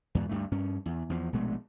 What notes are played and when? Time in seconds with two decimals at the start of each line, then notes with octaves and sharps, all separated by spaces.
0.15 E2 G#2 B2
0.29 D2 G2 A3
0.52 G2 C#4
0.86 E2
1.10 E2 F3
1.33 A#1 B2 G#3 A3